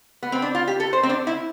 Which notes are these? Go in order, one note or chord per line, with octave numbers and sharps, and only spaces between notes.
B3
C4
D4
F4
G4
A4
C5
C4
D4
E4